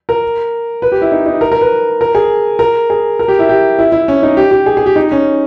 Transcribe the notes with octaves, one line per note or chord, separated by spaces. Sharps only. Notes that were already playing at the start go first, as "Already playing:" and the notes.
A#4
B4
G4
E4
D#4
D#4
A#4
A#4
B4
A#4
G#4
A#4
G#4
A#4
G4
E4
G4
E4
E4
C#4
D#4
G4
G4
G#4
G#4
G4
D#4
C#4